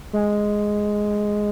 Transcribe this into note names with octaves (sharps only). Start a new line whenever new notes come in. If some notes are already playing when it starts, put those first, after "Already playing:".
G#3